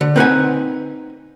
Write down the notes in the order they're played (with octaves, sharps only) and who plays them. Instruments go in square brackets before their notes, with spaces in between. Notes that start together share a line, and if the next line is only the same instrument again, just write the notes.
[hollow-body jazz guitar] D3
C4 D#4 B4 F5 F#5 G#5